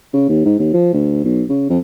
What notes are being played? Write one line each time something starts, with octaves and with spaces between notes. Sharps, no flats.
C#3
D#2
G#2
D#2
F3
D2
B1
C#3
F2